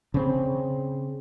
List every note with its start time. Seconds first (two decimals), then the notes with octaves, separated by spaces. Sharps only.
0.14 C#3 C4